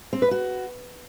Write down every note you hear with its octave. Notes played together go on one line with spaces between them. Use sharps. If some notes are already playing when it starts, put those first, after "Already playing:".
C4
B4
F#4